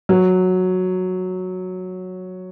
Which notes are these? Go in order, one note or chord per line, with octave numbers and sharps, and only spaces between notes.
F#3